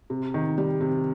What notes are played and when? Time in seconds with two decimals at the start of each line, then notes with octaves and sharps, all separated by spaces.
0.10 C3
0.34 D#3
0.58 G3
0.81 C3